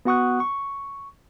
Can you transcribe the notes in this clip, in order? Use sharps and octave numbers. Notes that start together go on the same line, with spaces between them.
B3 F#4 F#5 C#6 D#6 F#6
C#6